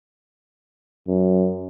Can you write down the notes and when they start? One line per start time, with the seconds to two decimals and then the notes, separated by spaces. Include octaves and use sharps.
1.09 F#2